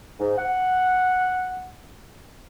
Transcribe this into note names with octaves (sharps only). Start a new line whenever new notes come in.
G#2
F#5